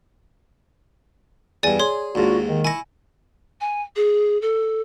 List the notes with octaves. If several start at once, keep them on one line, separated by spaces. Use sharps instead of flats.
E2 G2 D5 G#5
G#4 C#5 C6
D#2 G#2 D4 F4 F#4
D#3
E4 G#5 C#6 A#6
G#5
G#4
A4